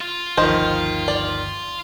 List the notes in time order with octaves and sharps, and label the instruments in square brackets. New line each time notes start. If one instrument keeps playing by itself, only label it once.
[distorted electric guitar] F4
[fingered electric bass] G1 D2 [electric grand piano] D#3 F3 [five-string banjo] C5 D#5
[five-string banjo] D5